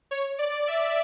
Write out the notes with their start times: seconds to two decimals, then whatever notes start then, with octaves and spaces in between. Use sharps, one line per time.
0.11 C#5
0.39 D5
0.68 E5